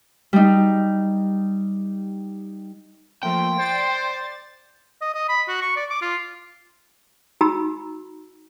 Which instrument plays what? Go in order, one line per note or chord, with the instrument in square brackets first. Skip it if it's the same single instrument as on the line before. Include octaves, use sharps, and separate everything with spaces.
[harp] G3 D#4
[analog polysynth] F3 A3 A#3 [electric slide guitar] G5 [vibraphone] C6
[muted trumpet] C5 [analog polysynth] D5 A6
[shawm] D#5
D#5
B5
F#4
C#6
D5
D6
F4
[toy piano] D#4 F#4 A#5 B5 E6